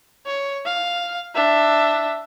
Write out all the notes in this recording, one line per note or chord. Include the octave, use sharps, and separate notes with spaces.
C#5
F5
D4 E5